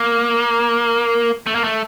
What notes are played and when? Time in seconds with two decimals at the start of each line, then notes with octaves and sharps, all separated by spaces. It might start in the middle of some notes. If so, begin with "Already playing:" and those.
Already playing: A#3
1.47 A3
1.55 A#3
1.64 A3